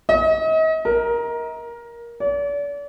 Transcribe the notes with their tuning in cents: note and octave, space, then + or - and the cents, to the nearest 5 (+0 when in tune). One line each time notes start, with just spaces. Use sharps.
D#5 +40
A#4 +15
D5 -40